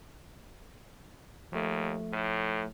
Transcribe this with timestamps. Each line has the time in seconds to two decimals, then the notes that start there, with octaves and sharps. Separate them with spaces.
1.52 D#2 F3 A3
2.13 A2